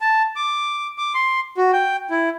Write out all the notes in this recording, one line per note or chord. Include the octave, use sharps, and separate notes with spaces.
A5
D6
D6
C6
F#4
G5
E4